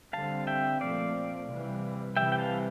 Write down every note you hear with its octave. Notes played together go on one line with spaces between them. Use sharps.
D3 G3 C4 F5 A5
E5 G5
A#2 F3 A3 C4 D5 F5
C3 E3 G3
C3 E3 G3 E5 G5
G5
F5 A5